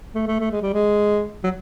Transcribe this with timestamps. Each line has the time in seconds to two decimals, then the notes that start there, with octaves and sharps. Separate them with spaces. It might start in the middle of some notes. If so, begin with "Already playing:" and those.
0.15 A3
0.27 A3
0.40 A3
0.51 G#3
0.62 G3
0.74 G#3
1.44 F#3